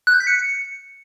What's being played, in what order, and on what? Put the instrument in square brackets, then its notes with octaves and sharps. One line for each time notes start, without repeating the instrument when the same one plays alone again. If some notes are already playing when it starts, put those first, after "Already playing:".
[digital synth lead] F#6
G6
B6
C#7